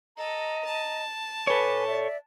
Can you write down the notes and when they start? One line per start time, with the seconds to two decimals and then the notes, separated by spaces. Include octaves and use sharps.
0.17 A4 D#5 A#5
0.64 A5
1.47 A4 B4 C#5 G#5 D6
1.88 D5 E5